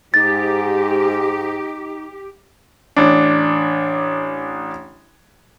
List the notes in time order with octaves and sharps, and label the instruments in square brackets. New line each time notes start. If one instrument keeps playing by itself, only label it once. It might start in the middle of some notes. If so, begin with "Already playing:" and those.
[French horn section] G#2 [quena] D#4 [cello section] G4 [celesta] A6
[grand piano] A1 D4